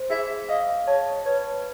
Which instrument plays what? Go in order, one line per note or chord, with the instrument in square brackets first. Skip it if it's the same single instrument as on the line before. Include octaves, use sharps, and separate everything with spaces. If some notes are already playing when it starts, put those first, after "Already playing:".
Already playing: [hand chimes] C5
[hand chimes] G#4 [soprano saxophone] E5
[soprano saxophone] D#5 [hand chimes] F5
[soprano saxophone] C#5 [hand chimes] A5
[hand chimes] B4 [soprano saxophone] C#5